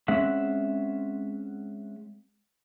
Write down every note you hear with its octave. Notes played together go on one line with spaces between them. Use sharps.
G#3 C4 C#4 E5 F#5